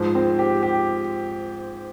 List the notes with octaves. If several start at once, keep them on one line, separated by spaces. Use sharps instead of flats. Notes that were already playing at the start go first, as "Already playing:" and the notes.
Already playing: G#2 F3
C4
G4
G4